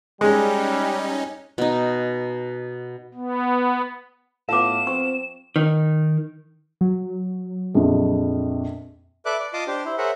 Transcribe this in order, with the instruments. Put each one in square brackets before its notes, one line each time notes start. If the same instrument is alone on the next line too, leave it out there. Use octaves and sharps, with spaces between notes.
[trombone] G3 [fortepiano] G#3 [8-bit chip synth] C#4 D#4
[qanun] B2 D#4
[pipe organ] B3
[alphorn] A2 [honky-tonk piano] B3 F4 A4 [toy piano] F5 D6 [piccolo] E7
[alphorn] C4 [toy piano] C#6
[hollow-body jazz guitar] D#3
[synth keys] F#3
[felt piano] A#1 F2
[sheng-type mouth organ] A4 B4 D5 E5 D6 F#6
D5
F4 D#5 A5 C6 D6 D#6
D4 G4 C5
E4 C5
G#4 A#4 C5 C#5 E5 F#5